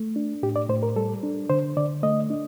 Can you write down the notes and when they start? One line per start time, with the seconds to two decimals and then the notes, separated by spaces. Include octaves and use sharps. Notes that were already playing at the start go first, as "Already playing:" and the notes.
Already playing: A3
0.16 D4
0.43 A2 G4
0.56 D5
0.69 A2 C5
0.83 A#4
0.96 G3 A4
1.23 D4
1.50 D3 C5
1.77 D3 D5
2.03 A3 D#5
2.30 D4